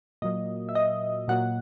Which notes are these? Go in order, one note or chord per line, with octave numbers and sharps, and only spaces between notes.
A#2 F#3 A#3 D#5
E5
D#5
A#2 F#3 A#3 F#5